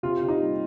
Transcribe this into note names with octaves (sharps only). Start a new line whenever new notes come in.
C3 F4
C3
D#4
G3